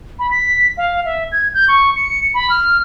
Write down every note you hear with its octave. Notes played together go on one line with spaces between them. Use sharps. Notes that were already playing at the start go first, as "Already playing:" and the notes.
B5
B6
F5
E5
G#6
G6
C#6
C#7
B5
F6